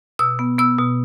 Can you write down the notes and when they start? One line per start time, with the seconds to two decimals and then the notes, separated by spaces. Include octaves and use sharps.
0.19 B2 E6
0.39 B3
0.58 B3 E6
0.78 B2